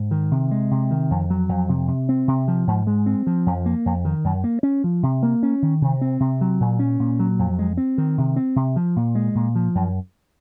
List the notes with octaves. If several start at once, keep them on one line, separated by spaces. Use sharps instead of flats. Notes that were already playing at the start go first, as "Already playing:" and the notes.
Already playing: G#2
D#3
C3
G#3
C3
D#3
F2
F#3
F2
C3
C3
C4
C3
F3
G#2
G#3
C4
F3
F2
A#3
F2
D#3
F#2
A#3
C#4
F3
C3
A#3
C#4
D#3
C3
C4
C3
F#3
A#2
C#4
A#2
F#3
F2
G#3
C4
D#3
C3
C4
C3
F3
A#2
G#3
A#2
F3
F#2